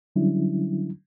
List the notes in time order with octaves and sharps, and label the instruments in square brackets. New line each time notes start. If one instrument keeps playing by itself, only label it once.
[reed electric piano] D3 F#3 G3 C#4 D4 E4